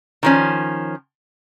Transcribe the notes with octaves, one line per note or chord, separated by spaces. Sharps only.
D#3 F3 C#4